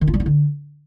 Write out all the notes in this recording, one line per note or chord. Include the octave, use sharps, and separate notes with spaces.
D#3
F4
G3
E4
D3